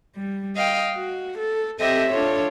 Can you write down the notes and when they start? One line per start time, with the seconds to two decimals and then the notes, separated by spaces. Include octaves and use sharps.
0.15 G3
0.57 D#5 F5 G5
0.94 F#4
1.37 A4
1.78 C4 G4 A4 D#5 E5
2.10 D4 F4 A4 C#5